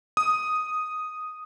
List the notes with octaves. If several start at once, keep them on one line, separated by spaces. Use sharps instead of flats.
D#6